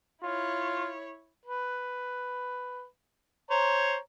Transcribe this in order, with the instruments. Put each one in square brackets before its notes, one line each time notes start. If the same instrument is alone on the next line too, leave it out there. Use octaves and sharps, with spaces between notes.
[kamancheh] E4 C#5 [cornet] F4
[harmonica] B4
C5 C#5 A#5